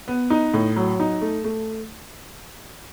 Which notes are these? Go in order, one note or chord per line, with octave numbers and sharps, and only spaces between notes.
B3
D#4
A2
F#3
D#4
A3
A3